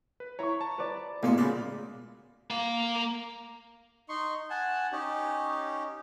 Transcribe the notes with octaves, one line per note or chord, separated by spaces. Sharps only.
B4
E4 C#5 A#5 C#6
A5
B4 D5
A1 B2 G#3 A#3 B3 F5 C6
A#2 C#3 G#3 B4 D5
A#3 F5
D#4 C6 C#6
F#5 G#5 A5
C#4 D#4 G4